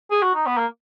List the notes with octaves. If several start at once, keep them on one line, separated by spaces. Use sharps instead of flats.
G#4
F#4
D#4
B3
A#3